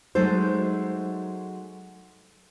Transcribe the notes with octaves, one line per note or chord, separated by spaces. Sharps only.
F#3 G#3 A3 D#4 A4 C5